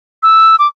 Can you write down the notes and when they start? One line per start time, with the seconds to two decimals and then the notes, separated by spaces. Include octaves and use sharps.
0.23 E6
0.59 D6